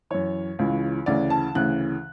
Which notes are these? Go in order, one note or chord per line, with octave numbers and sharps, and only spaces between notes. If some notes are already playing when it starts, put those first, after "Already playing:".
F#2 E3 C#5
C#2 C#3 E3
D2 C#3 E3 D5
A5
D2 C#3 E3 F#6